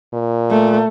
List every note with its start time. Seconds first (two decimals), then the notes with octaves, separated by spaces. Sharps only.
0.13 A#2
0.51 A3